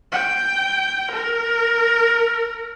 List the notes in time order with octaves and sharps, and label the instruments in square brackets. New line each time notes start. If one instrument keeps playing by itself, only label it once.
[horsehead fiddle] G5
A#4